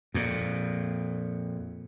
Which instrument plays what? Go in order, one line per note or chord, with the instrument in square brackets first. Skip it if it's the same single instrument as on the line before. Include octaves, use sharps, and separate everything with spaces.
[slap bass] F2 A#2